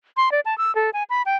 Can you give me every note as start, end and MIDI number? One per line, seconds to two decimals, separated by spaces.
0.17 0.31 84
0.32 0.40 74
0.45 0.57 81
0.58 0.74 88
0.75 0.90 69
0.93 1.03 80
1.10 1.22 83
1.26 1.37 79